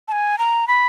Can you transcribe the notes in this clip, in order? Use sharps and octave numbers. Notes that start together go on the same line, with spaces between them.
A5
G#5
A#5
B5